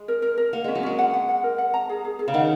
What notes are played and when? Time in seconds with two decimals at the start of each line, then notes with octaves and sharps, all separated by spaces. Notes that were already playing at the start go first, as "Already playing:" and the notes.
Already playing: G#3
0.08 A#4
0.22 A#4
0.38 A#4
0.53 A#3 F#5
0.64 G#3 C#4
0.75 F#3
0.83 G#3 C#4
0.99 F#5
1.14 F#5
1.29 F#5
1.44 A#4
1.58 F#5
1.74 A#5
1.89 G#4
2.05 G#4
2.19 G#4
2.28 C#3
2.34 D#3 F#5